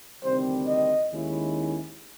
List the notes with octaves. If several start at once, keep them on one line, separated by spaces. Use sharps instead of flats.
D2 C3 D#3 G3 C4 C5
D#5
D#2 D#3 G#3 C#4 E4